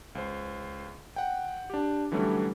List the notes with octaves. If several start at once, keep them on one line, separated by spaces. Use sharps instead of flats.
C#2 C5
F#5 G5
D4 G4
D3 E3 F#3 G3 A3 C#4